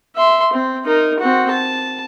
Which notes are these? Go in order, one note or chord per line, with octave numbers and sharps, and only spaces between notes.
E5 C6
C4
D#4 A#4
C4 F#4
A5